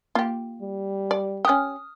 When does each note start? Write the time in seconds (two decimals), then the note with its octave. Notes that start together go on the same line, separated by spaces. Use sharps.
0.15 A#3 F4 G4
0.62 G3
1.11 D5
1.45 C#4 G4 D#6 F6